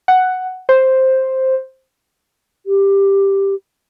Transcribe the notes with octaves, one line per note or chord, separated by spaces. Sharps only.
F#5
C5
G4